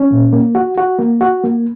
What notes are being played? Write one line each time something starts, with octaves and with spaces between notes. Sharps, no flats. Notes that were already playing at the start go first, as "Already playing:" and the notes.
Already playing: C#4
A#2
A#3
F#4
F#4
A#3
F#4
A#3